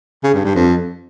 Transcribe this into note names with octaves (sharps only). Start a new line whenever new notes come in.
C#3
G2
G2
F2